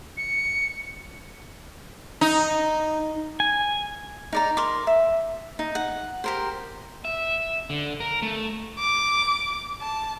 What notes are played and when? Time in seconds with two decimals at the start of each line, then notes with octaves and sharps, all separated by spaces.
0.17 C#7
2.21 D#4
3.40 G#5
4.33 D#4 D5 A#5
4.57 A#4 C6 D6
4.87 E5
5.59 D#4
5.75 F#5
6.24 G4 A#4 C5
7.05 E5
7.70 D3
8.00 A#4
8.22 A3
8.79 D6
9.81 A5